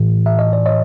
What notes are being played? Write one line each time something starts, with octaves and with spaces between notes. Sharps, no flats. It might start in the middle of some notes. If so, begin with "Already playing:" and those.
Already playing: A2 E3
E5
D#5
D5
C#5 D#5